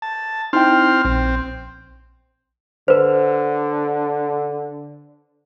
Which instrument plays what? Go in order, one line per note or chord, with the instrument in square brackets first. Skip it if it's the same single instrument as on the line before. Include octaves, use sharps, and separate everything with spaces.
[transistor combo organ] A5
[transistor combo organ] C4 C6 F6 [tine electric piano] D#4 E4 G5
[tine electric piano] A#1 [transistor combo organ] C4
[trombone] D3 [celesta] B4 C5